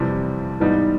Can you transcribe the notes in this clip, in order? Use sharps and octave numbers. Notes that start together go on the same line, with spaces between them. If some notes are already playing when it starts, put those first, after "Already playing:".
Already playing: F2 C3 E3 G3
G#2 E3 G3 B3 D#4